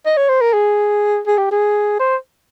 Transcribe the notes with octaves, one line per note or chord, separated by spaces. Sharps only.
D#5
C#5
C5
A#4
G#4
G#4
G4
G#4
C5